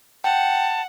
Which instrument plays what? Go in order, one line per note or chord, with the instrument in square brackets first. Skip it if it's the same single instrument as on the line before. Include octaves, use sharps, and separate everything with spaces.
[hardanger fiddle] F#5 [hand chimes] G5 [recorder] A5